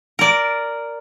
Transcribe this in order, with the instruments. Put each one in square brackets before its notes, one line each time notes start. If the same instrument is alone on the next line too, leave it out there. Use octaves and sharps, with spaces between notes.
[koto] A#4 D5